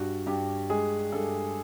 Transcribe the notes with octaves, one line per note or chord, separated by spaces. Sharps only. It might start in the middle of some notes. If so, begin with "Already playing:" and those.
Already playing: G2 F#4
G2 G4
G#3 G#4
G2 A4